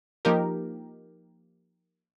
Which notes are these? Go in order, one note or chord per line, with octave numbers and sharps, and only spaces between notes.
F3 A#3 D#4 G4 A#4